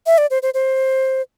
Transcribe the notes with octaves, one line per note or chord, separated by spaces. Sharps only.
E5
D5
C5
C5
C5